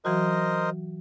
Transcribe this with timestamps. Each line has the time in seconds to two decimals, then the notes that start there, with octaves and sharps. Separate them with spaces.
0.05 E3 F#3 F#4 A#4 C5 D#5